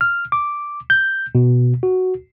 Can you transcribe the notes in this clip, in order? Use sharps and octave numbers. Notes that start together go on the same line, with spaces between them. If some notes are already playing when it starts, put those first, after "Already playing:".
F6
D6
G6
B2
F#4